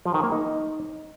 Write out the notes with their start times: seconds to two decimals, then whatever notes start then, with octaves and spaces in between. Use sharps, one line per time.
0.06 F3
0.14 D#3
0.23 A#3
0.32 D#4